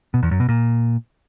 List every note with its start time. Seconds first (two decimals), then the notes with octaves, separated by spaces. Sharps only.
0.14 B2
0.23 E2
0.31 F#2
0.40 B2
0.49 A#2